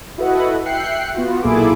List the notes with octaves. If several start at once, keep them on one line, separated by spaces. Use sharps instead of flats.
E4 F#4 A4 B4 D#5 F#5
E5 G5 F#6 C7 C#7
B3 F4 F#4
B1 A#2 E4 G#4 A4 D6